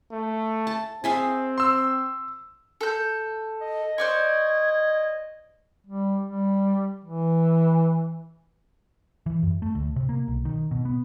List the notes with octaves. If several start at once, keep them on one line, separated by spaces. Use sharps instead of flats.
A3
A5
C4 G#4 E5 F5
C6 E6
A4 G6
D#5
C5 D5 C#6 G#6
G3
G3
E3
E3
F#2
A3
D2
C3
A#3
B1
D#3
B2
B3